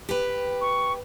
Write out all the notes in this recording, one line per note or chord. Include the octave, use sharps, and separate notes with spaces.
G4 B4
C#6